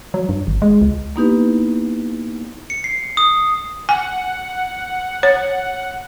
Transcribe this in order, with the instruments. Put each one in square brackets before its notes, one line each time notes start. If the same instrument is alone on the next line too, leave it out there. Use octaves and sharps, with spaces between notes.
[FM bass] F#3
G2
G#1
G#3
C#2
[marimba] A#3 B3 D#4 E4 G4 B4
[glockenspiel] C#7
C7
D#6
[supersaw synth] F#5 [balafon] G#5
[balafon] C#5